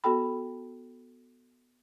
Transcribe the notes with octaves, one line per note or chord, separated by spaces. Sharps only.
B3 F#4 A4 G5 B5